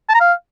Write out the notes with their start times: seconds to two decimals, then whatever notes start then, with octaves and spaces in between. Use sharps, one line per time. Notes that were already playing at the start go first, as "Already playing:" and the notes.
0.09 A5
0.14 A#5
0.20 F5